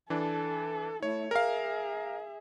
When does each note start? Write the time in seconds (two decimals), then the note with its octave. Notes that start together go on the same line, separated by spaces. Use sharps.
0.10 E3 D4 A4
1.03 A3 E4 C#5
1.31 G#4 A#4 E5 F5